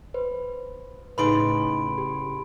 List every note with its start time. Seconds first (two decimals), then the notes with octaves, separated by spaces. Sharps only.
0.14 B4 C5
1.18 A2 C#3 D#4 G#4 B4 B5 C6 D7
1.98 G4